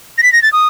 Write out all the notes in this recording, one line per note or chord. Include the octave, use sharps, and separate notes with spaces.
A#6
B6
A#6
A6
D#6